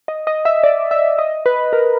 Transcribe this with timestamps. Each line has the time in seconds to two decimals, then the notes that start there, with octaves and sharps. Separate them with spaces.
0.08 D#5
0.27 D#5
0.45 E5
0.64 D5
0.91 E5
1.19 D#5
1.46 B4
1.73 A#4